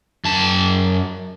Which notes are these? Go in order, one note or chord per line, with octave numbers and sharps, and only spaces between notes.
F#2 A5